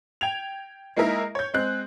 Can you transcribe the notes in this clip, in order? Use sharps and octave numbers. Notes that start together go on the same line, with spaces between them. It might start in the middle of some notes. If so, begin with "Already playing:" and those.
G5 G#6 F7
G#3 A#3 D#4 E4 A#4 E5
C#5 G6
G#3 C4 F#6